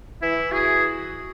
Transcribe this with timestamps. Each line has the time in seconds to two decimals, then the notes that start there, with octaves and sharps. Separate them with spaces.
0.22 E3 E4
0.52 F#4 G#4